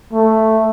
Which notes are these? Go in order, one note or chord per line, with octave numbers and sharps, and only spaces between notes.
A3